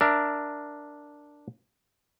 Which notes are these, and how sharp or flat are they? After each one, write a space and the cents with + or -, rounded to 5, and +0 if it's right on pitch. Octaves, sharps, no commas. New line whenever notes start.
D4 +0 A#4 +0 E5 +15